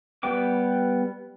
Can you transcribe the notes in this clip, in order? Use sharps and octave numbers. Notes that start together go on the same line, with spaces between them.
G3 B3 B4 G5 D6